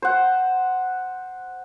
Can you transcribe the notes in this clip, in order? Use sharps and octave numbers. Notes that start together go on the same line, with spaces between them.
C5 F#5